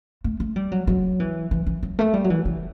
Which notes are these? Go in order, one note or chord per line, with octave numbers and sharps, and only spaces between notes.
A3
A3
G3
F#3
F#3
E3
E3
E3
F#3
A3
G3
F#3
E3
E3